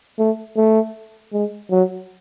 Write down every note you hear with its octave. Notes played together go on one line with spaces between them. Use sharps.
A3
A3
G#3
F#3